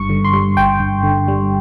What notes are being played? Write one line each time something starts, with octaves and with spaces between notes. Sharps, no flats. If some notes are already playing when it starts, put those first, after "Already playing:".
Already playing: G1 G2 C#6
D3
C6
G3
G1 G5
G2
D3
G3